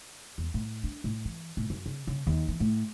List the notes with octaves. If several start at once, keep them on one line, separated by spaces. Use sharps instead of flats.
E2
A2
D4
A2
E3
A2
F#2
C#3
C#3
D#2
E3
A2